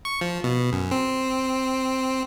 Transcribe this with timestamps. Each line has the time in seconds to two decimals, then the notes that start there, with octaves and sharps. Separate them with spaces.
0.05 C#6
0.21 F3
0.44 B2
0.73 F#2
0.91 C4